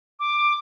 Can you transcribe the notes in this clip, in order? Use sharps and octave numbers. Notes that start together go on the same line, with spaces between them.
D6